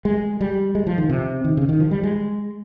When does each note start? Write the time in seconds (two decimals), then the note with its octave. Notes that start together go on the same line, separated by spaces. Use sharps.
0.05 G#3
0.41 G3
0.75 G#3
0.87 F3
0.98 D#3
1.09 C3
1.44 D#3
1.57 C#3
1.69 D#3
1.80 F3
1.91 G3
2.03 G#3